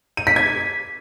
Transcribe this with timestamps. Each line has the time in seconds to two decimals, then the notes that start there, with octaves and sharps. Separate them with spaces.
0.17 D#7
0.27 B6
0.36 G#6